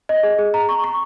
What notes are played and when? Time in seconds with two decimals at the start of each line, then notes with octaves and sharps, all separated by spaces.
0.09 D#5
0.23 G#4
0.38 G#4
0.54 A#5
0.69 C#6
0.84 C#6